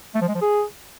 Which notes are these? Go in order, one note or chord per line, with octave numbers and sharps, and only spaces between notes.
A3
F3
G#3
F3
G#4